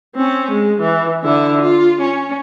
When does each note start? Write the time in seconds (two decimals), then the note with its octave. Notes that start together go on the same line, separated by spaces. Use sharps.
0.16 C4 C#4
0.52 G#3
0.81 E3
1.23 D3 E4
1.61 F4
2.01 C#4